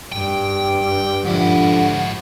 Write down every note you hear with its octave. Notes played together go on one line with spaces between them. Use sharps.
G2 G5
G#2 D3 F3 E4 F#5